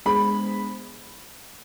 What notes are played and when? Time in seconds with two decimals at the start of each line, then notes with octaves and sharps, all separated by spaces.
0.06 G#3 B3 D4 G#4 C5 B5